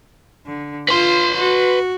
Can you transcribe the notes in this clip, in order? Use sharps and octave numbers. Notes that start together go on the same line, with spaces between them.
D3
F4 B4 C6
F#4